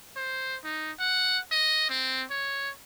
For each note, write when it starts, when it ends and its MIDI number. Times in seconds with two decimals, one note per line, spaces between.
0.16 0.56 72
0.64 0.91 63
0.99 1.39 78
1.52 1.89 75
1.90 2.24 60
2.30 2.70 73